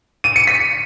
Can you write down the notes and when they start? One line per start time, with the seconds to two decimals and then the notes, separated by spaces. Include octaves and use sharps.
0.24 D#7
0.36 C#7
0.47 B6